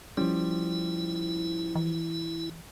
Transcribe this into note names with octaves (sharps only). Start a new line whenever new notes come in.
F3 G3 C#4 E4
E3